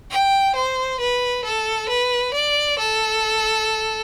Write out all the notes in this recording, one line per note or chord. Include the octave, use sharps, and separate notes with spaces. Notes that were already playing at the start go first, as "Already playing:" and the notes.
G5
C5
B4
A4
B4
D5
A4